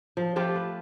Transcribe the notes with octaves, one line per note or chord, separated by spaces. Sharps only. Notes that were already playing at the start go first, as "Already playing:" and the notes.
F3
F3 A3 F4 G4
B4